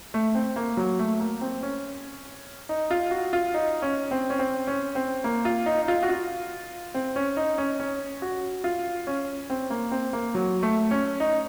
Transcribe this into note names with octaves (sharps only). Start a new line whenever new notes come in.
A3
C4
A#3
F#3
A3
A#3
C4
C#4
D#4
F4
F#4
F4
D#4
C#4
C4
C#4
C4
C#4
C4
A#3
F4
D#4
D#4
F4
F#4
F4
C4
C#4
D#4
C#4
C#4
F#4
F4
C#4
C4
A#3
C4
A#3
F#3
A3
C#4
D#4